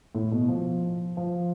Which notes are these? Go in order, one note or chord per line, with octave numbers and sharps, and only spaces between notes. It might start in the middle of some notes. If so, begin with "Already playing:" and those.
A2
B2
F3
F3